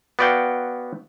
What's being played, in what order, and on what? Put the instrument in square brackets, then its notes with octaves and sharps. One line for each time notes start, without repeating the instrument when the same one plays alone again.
[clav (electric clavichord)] B3 F#4 D5 F5 G5